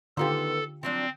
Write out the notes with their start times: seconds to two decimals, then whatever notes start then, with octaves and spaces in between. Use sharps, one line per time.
0.17 D3 D#3 B3 F4 G4 A4 C5
0.83 F3 F#3 C4 D4